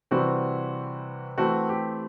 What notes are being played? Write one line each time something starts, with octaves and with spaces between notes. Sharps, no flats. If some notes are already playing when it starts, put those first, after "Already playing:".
C3 E3 G3 C4 F#4
E3 A3 C4 F#4
G4